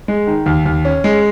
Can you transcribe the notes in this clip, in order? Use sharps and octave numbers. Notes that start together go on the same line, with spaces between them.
G#3
D#3
D#2
D#2
C#4
G#3